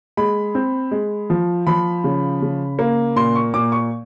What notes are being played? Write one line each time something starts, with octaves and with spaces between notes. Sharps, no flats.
G#3 B5
C4
G#3
F3
F3 B5
C#3
C#3
A#3
A#2 C6
C#6
A#2 D6
C#6